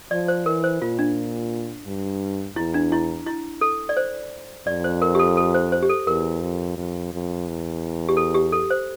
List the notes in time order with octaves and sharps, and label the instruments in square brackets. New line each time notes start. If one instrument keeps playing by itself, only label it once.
[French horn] F3 [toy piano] D5
[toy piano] C5
[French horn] E3 [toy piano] A#4
[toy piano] C5
[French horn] A#2 [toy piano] F4
[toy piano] D4
[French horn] G2
[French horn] E2 [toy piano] E4
[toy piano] D4
E4
E4
A4
D5
C5
[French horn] F2 [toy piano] D5
[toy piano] C5
A#4
G4
A4
A4
C5
C5
G4
A4
[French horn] E2 [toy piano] A#4
[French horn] F2
F2
F2
E2
[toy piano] G4
A4
G4
A4
C5